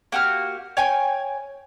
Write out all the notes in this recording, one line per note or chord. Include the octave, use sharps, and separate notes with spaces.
A#3 F#4 G4 F6
C#5 G5 G#5